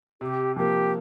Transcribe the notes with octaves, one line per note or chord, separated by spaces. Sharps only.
C3 G4
F3 A#3 G4